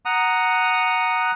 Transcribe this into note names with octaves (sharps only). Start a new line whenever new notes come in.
F#5 A#5 D#6